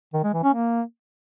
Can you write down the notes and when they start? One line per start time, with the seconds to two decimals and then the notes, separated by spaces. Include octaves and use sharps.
0.14 D#3
0.24 G#3
0.33 E3
0.43 C#4
0.53 A#3